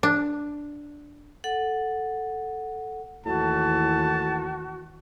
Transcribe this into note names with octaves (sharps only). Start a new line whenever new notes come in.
D4
A4 F#5
D#2 A2 E3 F#4 A5